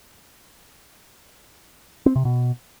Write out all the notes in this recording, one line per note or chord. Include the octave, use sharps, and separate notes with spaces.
C4
C3
B2